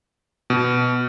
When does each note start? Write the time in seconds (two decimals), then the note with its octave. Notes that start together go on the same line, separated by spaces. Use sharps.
0.50 B2